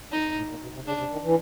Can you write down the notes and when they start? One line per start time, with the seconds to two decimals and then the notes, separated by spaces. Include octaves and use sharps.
0.12 F2 D#4
0.25 F2
0.37 A2
0.50 A#2
0.63 B2
0.75 C3
0.87 C#3 D4
0.99 C3
1.12 D#3
1.24 E3